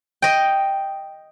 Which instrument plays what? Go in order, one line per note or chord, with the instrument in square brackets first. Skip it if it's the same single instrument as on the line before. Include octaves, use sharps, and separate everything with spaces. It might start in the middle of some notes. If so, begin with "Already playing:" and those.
[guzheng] D#5 G5